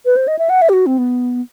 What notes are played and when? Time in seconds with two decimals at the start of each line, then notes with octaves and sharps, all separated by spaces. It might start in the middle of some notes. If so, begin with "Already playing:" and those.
0.05 B4
0.16 C5
0.28 D#5
0.39 E5
0.50 F#5
0.62 E5
0.69 G4
0.73 F#4
0.86 C4
0.98 B3